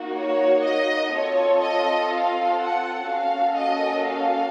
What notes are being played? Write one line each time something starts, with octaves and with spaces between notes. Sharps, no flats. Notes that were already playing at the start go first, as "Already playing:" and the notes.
Already playing: A#3 D#4 F#4
C#5
D#5
C4 F4 A4 C#5
D#5
F5
F#5
A#3 C#4 F#4 A4 F5
D#5
F5